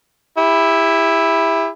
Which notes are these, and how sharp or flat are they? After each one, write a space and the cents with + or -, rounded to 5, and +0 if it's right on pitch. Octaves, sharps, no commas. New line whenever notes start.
E4 +0 G4 +35